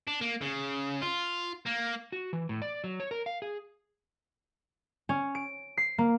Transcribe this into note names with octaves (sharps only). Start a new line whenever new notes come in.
D4
A#3
C#3
F4
A#3
F#4
E3
A2
D5
F#3
C#5
A#4
F5
G#4
C#4
D7
C7
A#3